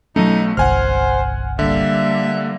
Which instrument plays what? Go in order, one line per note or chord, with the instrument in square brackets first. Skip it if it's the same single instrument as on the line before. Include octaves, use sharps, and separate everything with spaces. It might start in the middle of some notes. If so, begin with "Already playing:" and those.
[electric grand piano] B1 A3 [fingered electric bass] F#3 C#4 [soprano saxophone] D#4
[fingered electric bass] G1 C2 [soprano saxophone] C5 [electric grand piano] F#5 G#5 F6
[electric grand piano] D3 [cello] G3 A#3 [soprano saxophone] E5